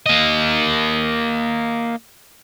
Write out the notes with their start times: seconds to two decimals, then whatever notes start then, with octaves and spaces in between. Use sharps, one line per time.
0.06 A#3 D#5